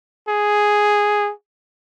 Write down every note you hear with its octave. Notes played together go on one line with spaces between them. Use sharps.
G#4